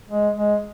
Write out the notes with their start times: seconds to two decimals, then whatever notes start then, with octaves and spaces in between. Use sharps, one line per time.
0.10 G#3
0.36 G#3